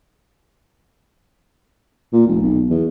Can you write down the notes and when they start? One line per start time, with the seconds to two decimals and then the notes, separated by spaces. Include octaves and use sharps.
2.13 A#2
2.27 F1
2.42 B1
2.70 E2